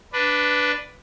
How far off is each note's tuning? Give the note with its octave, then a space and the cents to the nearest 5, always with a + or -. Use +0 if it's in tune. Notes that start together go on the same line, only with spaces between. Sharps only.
D4 +0 B4 +5